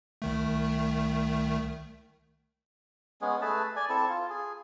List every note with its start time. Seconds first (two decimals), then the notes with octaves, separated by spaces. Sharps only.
0.22 C2 D#3 A3
3.21 G#3 B3 C#4 G#4
3.41 A3 G#4 B4 A5
3.76 D5 G#5
3.89 C4 E4 A4 A5
4.09 F4
4.30 G#4